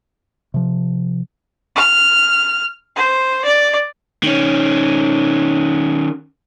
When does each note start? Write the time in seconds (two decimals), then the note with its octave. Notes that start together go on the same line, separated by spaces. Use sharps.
0.54 C3 F3
1.76 F6
2.96 C5
3.45 D5
4.23 D#3 C#4